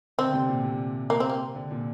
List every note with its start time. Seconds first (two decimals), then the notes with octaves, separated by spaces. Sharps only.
0.18 D3 C4
0.34 C3
0.49 A#2
0.65 C3
1.10 A#3
1.20 C4
1.30 A#3
1.55 D3
1.71 A#2